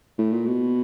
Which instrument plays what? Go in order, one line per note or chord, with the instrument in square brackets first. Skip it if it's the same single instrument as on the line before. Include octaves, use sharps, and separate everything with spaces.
[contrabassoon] A2
A#2
B2